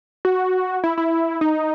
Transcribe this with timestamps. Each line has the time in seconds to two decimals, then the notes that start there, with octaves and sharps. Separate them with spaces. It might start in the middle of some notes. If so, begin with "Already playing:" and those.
0.25 F#4
0.84 E4
0.98 E4
1.41 D#4